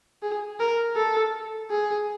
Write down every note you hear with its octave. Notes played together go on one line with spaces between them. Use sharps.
G#4
A#4
A4
G#4